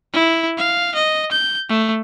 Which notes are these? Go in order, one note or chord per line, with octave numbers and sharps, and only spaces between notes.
E4
F5
D#5
G6
A3